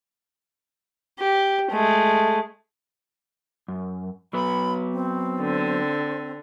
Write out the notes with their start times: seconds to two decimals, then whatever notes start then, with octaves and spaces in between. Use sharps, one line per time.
1.19 G4
1.71 G#3 A3
3.68 F#2
4.33 F#3 B3 B4 B5
4.93 C4
5.40 D3